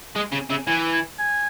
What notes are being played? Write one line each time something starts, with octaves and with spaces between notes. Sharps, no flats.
G#3 D#5
C#3
C#3 E5
E3 G#5
G#5
G#5